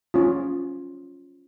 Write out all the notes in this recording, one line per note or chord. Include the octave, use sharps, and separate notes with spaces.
C#4 F4